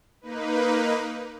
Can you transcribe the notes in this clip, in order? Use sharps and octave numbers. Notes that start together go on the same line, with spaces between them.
A#3 D#4 B4